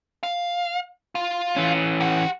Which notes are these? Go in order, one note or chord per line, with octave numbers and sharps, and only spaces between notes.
F5
F4
E3 C#4
G4 F#5